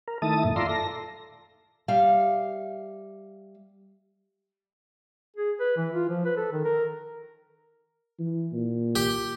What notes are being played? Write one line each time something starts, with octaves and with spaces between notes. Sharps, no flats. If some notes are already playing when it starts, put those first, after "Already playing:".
A#4
D#3 A3 E4 A5 D#6
F#2 A#2
F4 D5 E5 A#5 C6
A4 A#6
G3 E5 F5
G#4
B4
E3
F4
F3
B4
A4
D#3
A#4
E3
A#2
G4